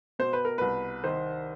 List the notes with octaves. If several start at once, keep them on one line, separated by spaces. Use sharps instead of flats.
B2 C5
B4
A#4
C2 B4
D#3 C5